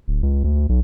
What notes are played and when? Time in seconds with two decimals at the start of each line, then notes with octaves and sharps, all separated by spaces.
0.08 D1
0.23 C#2
0.44 D2
0.69 B1